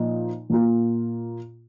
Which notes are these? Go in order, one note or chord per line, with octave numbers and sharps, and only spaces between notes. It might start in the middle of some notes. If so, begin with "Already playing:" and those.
Already playing: A#2 F3 D#4
A#2 A#3 F4